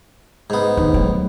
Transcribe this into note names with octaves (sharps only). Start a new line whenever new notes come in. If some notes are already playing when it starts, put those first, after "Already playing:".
G#2 B3
D#2
F#3 A3